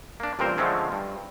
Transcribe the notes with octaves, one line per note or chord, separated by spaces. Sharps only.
A#3 D4
A1 G2 A#2 C4 A#4 C5
D3 F3 G#3 A3 C4 C#4
G2